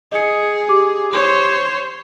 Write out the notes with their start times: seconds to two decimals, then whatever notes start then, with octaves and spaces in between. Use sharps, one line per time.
0.12 G#4 D#5 C#7
0.69 G4 D6
1.12 C5 C#5